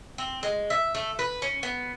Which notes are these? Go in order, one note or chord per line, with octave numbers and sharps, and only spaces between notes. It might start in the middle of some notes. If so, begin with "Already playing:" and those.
C4
G#3
E5
A3
B4
C#4
B3